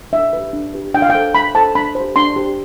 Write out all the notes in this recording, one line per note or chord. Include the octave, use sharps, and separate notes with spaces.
D4 E5
G4 B4
D4
G4 B4
D4 G5
F5
A4 C5 G5
D4 B5
A4 C5 A5
D4 B5
C5
G4
D4 C6
G4 C5